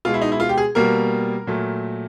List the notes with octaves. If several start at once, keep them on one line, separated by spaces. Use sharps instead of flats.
B2 G#3 F4
E4
D#4
E4
F4
G4
G#4
B2 G3 A#3 A#4
A#2 F#3 A3